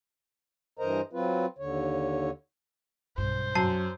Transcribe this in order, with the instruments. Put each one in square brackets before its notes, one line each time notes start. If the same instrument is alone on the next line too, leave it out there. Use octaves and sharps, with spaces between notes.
[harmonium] G2 E3 A#4 C5 D#5 A#5
F#3 C4 F4 B4
D#2 D3 C#5
[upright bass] B1 G2 [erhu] C5
[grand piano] F#2 [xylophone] A5 C7